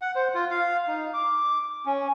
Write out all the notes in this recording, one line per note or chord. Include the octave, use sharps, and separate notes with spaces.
F#5
C5
F4
F5
D#4
D6
C#4